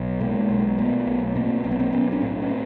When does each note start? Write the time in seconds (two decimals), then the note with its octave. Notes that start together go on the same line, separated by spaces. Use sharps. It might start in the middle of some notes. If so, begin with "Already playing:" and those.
Already playing: B1
0.20 B2 G#3 A#3
0.50 B1
0.78 B2 A3 B3
1.07 B1
1.35 B2 A#3 C4
1.64 B1 C4
1.71 B3
1.79 A#3 C4
1.92 B1 B3 C#4
2.12 C4 D4
2.22 A2
2.42 C#4
2.50 C4